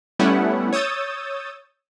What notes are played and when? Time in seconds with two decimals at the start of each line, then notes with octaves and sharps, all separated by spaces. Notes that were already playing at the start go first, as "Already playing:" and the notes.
0.19 G3 A3 B3 C#4 E4 F#5
0.73 C#5 D#6 E6 G6 A6